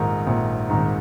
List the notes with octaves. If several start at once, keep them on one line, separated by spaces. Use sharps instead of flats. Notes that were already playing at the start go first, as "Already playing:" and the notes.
Already playing: A#1 G#2 D#3 A#4
A#1
G#2 D#3